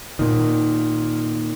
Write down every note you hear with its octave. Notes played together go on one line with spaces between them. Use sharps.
A#2 D#3